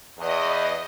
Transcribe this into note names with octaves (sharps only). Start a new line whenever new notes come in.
E2 D#5